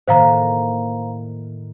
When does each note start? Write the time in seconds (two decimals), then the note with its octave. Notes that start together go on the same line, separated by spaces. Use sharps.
0.08 A2 D#3 A#3 C5 F5 A#5